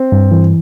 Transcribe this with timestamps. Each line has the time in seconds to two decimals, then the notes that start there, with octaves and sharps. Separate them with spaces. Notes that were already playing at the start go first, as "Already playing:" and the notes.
Already playing: C4
0.12 G2
0.31 E3